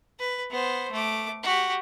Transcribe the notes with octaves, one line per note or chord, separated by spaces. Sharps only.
B4
B3 C5
A3 D6
F#4 G4